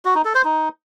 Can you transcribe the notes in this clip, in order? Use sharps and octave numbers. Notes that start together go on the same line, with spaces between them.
F#4
D#4
A4
C5
D#4